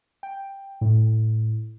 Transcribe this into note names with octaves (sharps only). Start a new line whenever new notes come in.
G5
A2